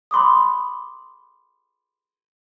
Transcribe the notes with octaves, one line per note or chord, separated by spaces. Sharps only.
B5 C6 D6 D#6